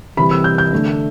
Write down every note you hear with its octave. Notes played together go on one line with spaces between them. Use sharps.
C3 E3 G3 B5
E6
G6
G6
D3 A3